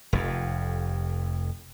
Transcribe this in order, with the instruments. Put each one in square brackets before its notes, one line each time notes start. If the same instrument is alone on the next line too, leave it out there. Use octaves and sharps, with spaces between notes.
[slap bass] F1 F2